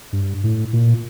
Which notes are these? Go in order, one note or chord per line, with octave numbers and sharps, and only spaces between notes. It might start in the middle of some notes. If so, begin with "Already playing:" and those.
G2
A2
A#2